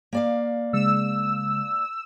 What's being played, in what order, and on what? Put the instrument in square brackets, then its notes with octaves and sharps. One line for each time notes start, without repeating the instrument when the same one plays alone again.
[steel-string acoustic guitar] A#3 D5 F5
[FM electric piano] C#3 G#3 [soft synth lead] E6